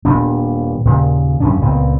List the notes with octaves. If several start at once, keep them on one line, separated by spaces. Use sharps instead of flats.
D#1 A#2 B3 D4
D#2 A#2 C#3
F#2 F3 C#4 D4
C#2 A#2 B3 C4